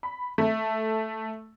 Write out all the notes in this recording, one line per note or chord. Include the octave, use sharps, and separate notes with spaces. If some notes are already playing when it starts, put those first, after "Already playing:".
B5
A3